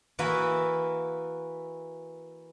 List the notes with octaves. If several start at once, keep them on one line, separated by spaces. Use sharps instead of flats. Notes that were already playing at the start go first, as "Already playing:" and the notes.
E3 A#3 E4 F#4 B4 E5